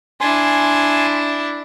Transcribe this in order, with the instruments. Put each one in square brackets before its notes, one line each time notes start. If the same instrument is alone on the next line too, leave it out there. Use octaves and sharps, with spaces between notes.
[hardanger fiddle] D4 E4 [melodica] G#5 C6